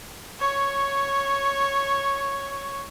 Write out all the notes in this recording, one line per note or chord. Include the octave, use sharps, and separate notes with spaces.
C#5 C#6